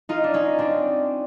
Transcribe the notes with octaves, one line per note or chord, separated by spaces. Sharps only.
D#4 F4
D4
C#4 D#4
C4 D4